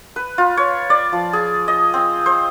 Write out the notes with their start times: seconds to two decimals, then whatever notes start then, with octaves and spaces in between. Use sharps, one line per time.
0.16 B4
0.38 F4
0.57 C#5
0.90 D5
1.13 F3
1.33 G#4
1.68 D#5
1.94 C4
2.26 C5